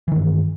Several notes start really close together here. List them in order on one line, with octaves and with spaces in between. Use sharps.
E3 D#3 G2